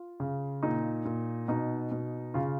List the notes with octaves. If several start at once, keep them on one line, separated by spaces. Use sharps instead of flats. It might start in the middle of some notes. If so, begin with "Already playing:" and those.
Already playing: F4
C#3
A#2 D#4
A#2
B2 D#4
B2
C#3 F4